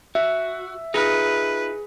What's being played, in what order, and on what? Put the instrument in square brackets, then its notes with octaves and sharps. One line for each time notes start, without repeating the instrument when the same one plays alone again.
[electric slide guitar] F#4 [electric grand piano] E5
[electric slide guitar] D#4 F4 [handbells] G#4 [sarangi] B4